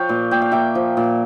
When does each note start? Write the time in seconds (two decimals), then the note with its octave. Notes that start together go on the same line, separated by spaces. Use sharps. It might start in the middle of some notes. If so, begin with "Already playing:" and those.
Already playing: F3 C#5 F5 G5
0.09 A#2
0.31 A#2 G5
0.42 F5
0.52 A#3 E5 G5
0.75 F3
0.97 A#2